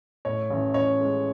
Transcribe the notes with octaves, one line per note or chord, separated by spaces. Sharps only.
A2 C#5
A1
A1 C#5
G#3